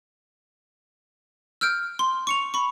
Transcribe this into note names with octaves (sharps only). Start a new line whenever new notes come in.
E6 F6 G6 D7
C6
C#6 C#7 F7
B5 C#6